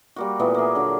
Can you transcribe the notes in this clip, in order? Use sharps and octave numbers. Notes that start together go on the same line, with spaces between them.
G3 A#3 F#4
A#2 E3 A3 B3
A#3 G#4
D3 F#3